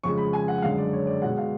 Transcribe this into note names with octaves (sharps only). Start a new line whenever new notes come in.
F2 C#3 G#3 C#6
B5
G#5
F#5
F#2 D3 G#3 F5
D5
C#5
D5
B2 G#3 F#5
F5